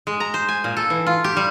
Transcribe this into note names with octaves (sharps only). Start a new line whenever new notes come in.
G#3
A#5
C5
G#5
A#2
A4
E3
F4
G4
G3